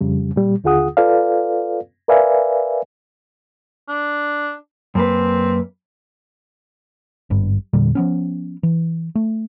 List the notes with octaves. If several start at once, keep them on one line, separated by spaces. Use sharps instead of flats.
F2 C#3 G3
A#2 G3
D#2 D3 F4 G#4 F#5 D#6
F4 A4 B4 D5 F5
A#4 B4 D5 E5 F5 G#5
D4
F#2 A#3 C4 B4
G#1 G2
E2 A#2 D3 G3
F3 B3 C#4
E3
A3